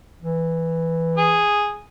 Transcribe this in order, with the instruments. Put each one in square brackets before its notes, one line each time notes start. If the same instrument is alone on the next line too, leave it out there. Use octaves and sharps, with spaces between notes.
[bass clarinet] E3
[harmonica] G#4